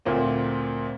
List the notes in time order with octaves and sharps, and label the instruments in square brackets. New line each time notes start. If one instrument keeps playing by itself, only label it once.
[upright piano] D2 A#2 A#3 C4